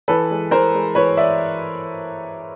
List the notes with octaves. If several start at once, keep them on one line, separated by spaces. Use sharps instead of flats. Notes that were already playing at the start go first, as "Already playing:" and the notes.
E3 A4 B4
G#3
E3 A#4 C5
G#3
E3 B4 C#5
D5 E5